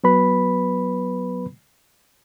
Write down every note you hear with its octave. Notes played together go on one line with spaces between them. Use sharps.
F#3 B3 B4 B5